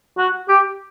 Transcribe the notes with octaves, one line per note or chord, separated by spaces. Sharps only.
F#4
G4